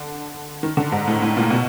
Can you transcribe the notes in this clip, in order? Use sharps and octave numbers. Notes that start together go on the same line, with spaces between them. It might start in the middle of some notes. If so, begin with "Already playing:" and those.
Already playing: D3
D#3
D3
G#2
A2
A2
A#2
B2